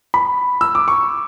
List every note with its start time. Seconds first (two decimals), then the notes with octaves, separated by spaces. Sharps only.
0.14 B5
0.61 E6
0.75 D6
0.88 C#6